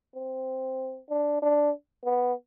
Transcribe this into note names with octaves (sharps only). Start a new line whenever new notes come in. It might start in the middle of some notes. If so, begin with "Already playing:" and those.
C4
D4
D4
B3